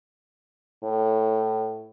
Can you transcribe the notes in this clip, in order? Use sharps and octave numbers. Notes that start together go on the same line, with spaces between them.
A2